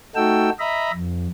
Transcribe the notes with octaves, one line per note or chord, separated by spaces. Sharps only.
A3 D#4 F#4 A4 G5 E6
D#5 E5 A#5 B5
F2